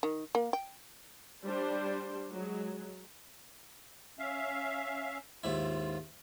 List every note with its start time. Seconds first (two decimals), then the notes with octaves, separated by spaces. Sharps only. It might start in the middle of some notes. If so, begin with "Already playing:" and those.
0.03 D#3
0.35 A#3
0.53 G5
1.45 G3 D4 C5
2.31 F#3 G#3
4.19 C#4 E5 F5
5.44 D#2 G#2 E4 F4